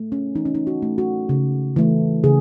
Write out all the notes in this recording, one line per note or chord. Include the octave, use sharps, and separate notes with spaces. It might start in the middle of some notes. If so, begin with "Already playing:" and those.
Already playing: A3
C#4
E3 D#4
C#4
D#4
F#4
A3
F#4
C#3
E3 A3
C#3 G#4